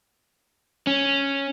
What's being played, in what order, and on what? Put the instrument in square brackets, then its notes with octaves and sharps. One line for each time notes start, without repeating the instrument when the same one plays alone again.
[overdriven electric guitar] C#4